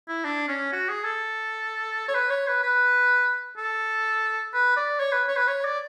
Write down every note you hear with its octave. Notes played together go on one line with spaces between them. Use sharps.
E4
D4
C#4
F#4
G#4
A4
C#5
B4
C#5
B4
B4
A4
B4
D5
C#5
B4
C#5
B4
C#5
D5